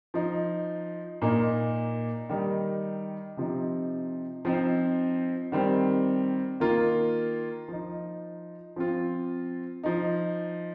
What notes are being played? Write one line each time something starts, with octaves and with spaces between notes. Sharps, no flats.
F3 D#4
A#2 A#3 D#4
D#3 G3 D#4
C3 F3 D#4
F3 C4 D#4
D#3 G3 C4
D#3 A#3 F4
F3 D#4
F3 C4 F4
F3 D#4